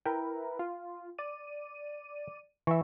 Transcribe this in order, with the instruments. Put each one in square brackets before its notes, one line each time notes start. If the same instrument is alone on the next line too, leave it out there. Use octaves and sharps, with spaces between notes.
[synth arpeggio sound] E4 A#4 B4 [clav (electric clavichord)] G5
[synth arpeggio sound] F4
D5 D#7
[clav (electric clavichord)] E3 [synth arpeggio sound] E5 C#6